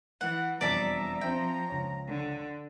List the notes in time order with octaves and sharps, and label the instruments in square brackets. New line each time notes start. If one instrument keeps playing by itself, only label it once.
[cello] E3 [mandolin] F#5
[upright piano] E1 F2 [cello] G3 [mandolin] D5 E5 A5 [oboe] A#5
[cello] F3 [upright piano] C4 E5 [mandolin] G5
[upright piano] C#2 C#5
[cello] D3